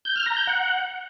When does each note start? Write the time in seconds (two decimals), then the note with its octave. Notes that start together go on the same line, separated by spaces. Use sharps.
0.05 G6
0.16 F6
0.26 A#5
0.37 G6
0.47 F#5